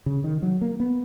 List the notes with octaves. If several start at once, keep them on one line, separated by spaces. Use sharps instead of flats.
C#3
D#3
F#3
A#3
B3